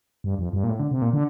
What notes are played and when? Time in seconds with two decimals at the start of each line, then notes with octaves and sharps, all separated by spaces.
0.24 G2
0.39 F2
0.53 G2
0.64 A#2
0.69 A2
0.80 D3
0.91 C3
1.02 A#2
1.13 D3